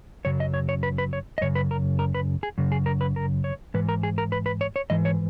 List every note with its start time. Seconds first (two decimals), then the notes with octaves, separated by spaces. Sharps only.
0.25 F#2 C#3 F#3 C#5
0.40 D#5
0.54 C#5
0.69 C#5
0.83 B4
0.98 B4
1.13 C#5
1.38 D#5
1.41 F#2 C#3 C#5
1.55 B4
1.71 A#4
1.99 A#4
2.15 B4
2.43 G#4
2.58 F#2 C#3
2.72 G#4
2.86 A#4
3.01 B4
3.16 A#4
3.44 C#5
3.74 G#2 E3 B4
3.89 A#4
4.03 G#4
4.18 A#4
4.32 B4
4.46 B4
4.61 C#5
4.76 C#5
4.90 G#2 E3 D#5
5.05 C#5